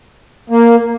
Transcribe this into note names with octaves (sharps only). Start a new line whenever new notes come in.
A#3